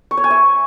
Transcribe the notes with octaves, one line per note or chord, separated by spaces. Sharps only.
C#6
C#5
G#5
E5